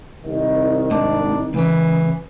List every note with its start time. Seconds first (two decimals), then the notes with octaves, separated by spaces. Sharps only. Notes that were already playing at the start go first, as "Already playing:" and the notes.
0.24 C2 D#3
0.91 G#2 D4
1.54 C#2 C#3 E3